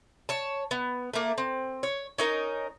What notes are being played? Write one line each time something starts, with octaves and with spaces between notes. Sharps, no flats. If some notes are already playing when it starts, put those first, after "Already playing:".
C#5 A5
B3
A3 A#3
C4
C#5
C#4 D#4 A#4